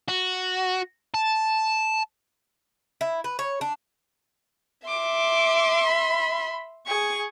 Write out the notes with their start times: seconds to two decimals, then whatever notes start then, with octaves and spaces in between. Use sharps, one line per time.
0.08 F#4
1.14 A5
3.01 E4
3.24 B4
3.39 C#5
3.61 D4
4.88 E5 C6 D6
5.86 B5
6.87 G#4 C#6